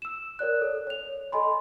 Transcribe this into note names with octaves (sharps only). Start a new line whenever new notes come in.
E6 E7
A#4 C#5 D5 F#6
A4
C#5 F7
A4 D#5 G#5 B5 C6